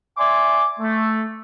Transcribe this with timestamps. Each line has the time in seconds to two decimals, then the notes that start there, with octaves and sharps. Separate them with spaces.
0.18 D5 E5 G#5 C6 D6
0.79 A3